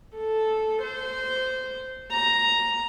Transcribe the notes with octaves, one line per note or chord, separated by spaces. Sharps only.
A4
C5
A#5